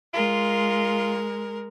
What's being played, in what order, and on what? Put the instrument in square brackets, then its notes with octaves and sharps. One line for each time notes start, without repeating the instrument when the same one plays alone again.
[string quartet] G#3 A#4 [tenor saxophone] F4